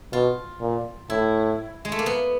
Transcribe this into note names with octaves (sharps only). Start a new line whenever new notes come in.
B2 F4
A#2
A2 E4
G#3
A3
A#3
B3